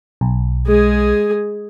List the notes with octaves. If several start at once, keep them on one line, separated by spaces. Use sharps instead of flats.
B1
G#3 G#4